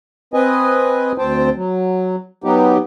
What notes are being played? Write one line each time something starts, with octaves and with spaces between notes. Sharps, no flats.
C4 B4 D#5 G#5
D2 C4 C5 G5 A5
F#3
F#3 B3 D#4 G4